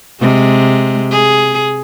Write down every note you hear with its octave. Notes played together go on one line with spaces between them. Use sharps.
C3 G#3
G#4